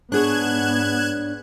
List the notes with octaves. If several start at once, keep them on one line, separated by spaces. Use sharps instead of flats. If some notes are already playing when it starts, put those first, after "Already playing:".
G#2 B3 D4 G#4 C#5 F#6 G#6 E7